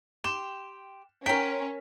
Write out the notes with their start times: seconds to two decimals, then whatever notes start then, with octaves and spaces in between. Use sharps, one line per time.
0.24 G4 G5 C6 E7
1.26 C#4 A#4 G5 A5 A#5 C6 B6